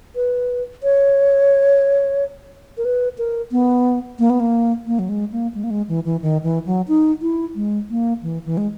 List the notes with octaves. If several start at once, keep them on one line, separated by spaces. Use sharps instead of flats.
B4
C#5
A#4
B4
A#4
B3
A#3
B3
A#3
A#3
F#3
G#3
A#3
G#3
A#3
G#3
E3
E3
D#3
E3
F#3
D#4
E4
G#3
A#3
E3
E3
G#3